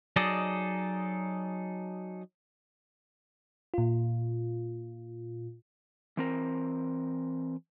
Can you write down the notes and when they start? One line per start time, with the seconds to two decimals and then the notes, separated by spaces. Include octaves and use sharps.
0.16 F#3 D#4 G#4 A4 D5 D#5
3.74 A#2 F4
6.17 E3 C4 A#4